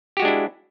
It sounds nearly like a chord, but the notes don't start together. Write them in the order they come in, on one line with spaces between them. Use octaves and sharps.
G4 F#4 G#3 D4 E4